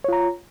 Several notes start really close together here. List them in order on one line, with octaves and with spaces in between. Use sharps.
C#5 F4 A#5